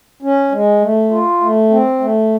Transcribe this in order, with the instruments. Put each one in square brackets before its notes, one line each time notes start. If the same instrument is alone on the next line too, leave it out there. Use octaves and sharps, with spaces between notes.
[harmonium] C#4
G#3
A3
F4
A3
C4
A3